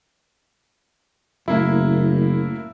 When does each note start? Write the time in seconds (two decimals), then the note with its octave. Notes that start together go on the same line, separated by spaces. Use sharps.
1.48 F#1 A2 A#3 E4